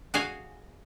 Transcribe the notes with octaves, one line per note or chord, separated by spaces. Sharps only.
F#4 G#4 D#5 F5 G#5